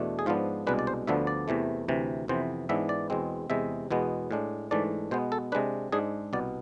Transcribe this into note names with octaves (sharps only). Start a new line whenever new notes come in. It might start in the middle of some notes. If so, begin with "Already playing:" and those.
Already playing: E2 B2 A3 D4
G#4
G#2 F3 B3 D4 F4
C2 B2 G#3 D4 B4
D5
C5
D2 D3 F3 B3 D4 E5
D5
E2 C3 E3 A3
D2 C3 E3
F2 C3 E3 B3 C5
G#2 E3 B3 D4 E5
D5
E2 B2 G#3 C4
E2 C3 G#3 E5
E2 B2 G#3 B3
A2 G#3 D4
G#2 E3 A3 D4 D5
B2 G#3 B3 C5
A4
C3 G#3 D4 B4
G#2 G#3 D4 G#4
C2 B2 B3 D5